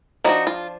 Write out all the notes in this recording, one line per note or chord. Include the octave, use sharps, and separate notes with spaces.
F3 A#3 D4 D#4 F#4
F4